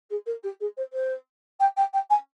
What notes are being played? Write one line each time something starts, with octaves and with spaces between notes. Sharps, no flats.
G#4
A#4
G4
G#4
C5
C5
G5
G5
G5
G#5